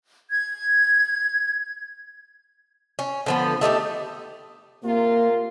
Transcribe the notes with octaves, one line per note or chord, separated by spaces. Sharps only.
G#6
C#4
D3 F3 B3
A3 D#4 F4 G4
C3 A#3 F4 A#4